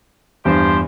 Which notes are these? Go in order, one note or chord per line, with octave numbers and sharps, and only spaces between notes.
E2 G2 F3 G4 C5